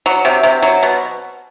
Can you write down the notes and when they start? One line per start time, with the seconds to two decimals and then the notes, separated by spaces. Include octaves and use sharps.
0.06 F#3
0.25 C3
0.43 C3
0.62 F#3
0.83 B2